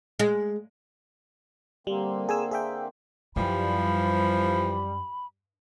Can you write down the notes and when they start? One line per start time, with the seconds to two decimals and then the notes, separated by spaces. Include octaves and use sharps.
0.20 G#3
1.87 D3 G3 A#3 C4
2.29 G#4 G#5 E6
2.51 G#4 E5 G5
3.36 F#2 E3 F3 G3 B5